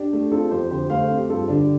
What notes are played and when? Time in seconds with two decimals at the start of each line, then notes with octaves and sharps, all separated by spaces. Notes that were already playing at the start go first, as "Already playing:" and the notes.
Already playing: D4 G4
0.13 A3
0.31 C4 F4 A4
0.51 F2 G4 C5
0.70 D3 G4 C5
0.90 A3 C5 F5
1.10 C4
1.17 G4
1.29 G2 F4 A4
1.48 D3 D4 G4